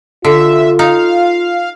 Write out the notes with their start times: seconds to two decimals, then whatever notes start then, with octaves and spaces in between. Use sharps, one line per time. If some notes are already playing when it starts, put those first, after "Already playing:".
0.25 D3 F4 E5
0.79 D#4 F5